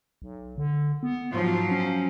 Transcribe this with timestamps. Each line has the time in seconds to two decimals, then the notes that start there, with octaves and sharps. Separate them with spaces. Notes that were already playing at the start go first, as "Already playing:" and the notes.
0.22 B1
0.58 D3
1.03 B3
1.34 G#2 F3 F#3
1.71 C#4